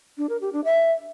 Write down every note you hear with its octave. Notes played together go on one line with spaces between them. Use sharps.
D4
A#4
G4
D4
E5